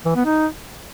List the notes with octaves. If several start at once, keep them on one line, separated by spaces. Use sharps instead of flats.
E3
B3
D#4